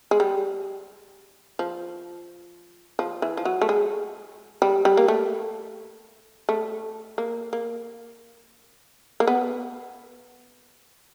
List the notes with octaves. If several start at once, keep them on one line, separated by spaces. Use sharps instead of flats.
G#3
G3
F3
F3
E3
F3
F#3
A3
G#3
G3
G3
A#3
A3
A3
A#3
A#3
A#3
B3